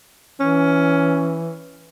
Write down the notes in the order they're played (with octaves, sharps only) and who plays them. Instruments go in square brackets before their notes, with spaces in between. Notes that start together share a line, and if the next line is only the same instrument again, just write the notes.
[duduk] E3 [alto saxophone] C#4